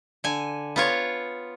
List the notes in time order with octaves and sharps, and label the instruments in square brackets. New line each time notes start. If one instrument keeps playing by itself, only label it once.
[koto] D3 G#5
B3 F4 C#5